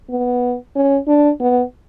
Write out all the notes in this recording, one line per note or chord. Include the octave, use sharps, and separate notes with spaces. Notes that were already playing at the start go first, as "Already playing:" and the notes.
B3
C#4
D4
B3